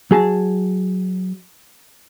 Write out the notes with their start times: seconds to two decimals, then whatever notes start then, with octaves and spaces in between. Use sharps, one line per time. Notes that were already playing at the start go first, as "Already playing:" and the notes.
0.11 F#3 G#4 A5